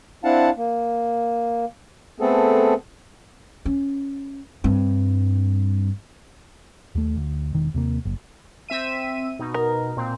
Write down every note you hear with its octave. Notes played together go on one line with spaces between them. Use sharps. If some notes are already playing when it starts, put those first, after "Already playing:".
C4 D4 E4 F5 F#5 A5
A#3
A3 B3 C4 G#4 A4
C#4
G2 C4
D#2 A3
D2
E1 D#3
D#2 C3 A#3
F#1
C4 E5 D#7
B2 D#4
A#4
A#2 C4